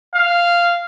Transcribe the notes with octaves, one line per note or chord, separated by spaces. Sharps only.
F5